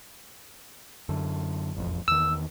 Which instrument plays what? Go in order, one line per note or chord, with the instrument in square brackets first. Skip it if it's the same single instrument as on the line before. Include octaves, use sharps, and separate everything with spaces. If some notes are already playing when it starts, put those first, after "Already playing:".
[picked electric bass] F#2 D3
E1 A1 F2
[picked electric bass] E2 D#3 [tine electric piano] E6